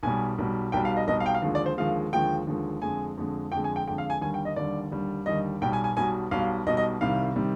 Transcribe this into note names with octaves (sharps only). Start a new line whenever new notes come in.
B1 B2 G3 G#5
B1 B2 G3
B1 B2 G3 G5
F5
D#5
B1 B2 G3 D#5
F5
G5
F5
D#2 D3 F3 G#3
D5
C5
D#2 D3 F3 G#3 F5
D#2 D3 F3 G#3 G5
D#2 D3 F3 G#3
F2 D3 G#3 G#5
F2 D3 G#3
F2 D3 G#3 G5
G#5
G5
F2 D3 G#3 G5
F5
G#5
D#2 D3 G3 G#5
G5
D#5
D#2 D3 G3 D5
D#2 D3 G3
D#2 D3 G3 D#5
B1 B2 G3 G5
G#5
G#5
B1 B2 G3 G#5
B1 B2 G3 F5
B1 B2 G3 D#5
D#5
C2 C3 D#3 G3 F5
C3 D#3 G3